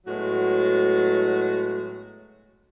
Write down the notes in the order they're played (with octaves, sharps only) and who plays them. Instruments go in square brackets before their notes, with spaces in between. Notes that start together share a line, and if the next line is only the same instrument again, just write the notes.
[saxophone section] A2 F#3 G#3 B3 F#4